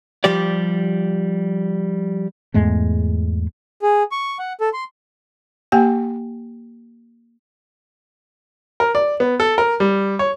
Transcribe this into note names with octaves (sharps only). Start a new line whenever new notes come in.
F3 G3 G4 D5
E2 G#2 G#3 A3
G#4
C#6
F#5
A4
C6
A#3 G4 G5 G#5
A#4
D5
B3
A4
A#4
G3
C#5